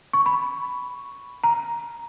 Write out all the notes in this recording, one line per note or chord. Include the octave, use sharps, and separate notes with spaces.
C#6
B5
A#5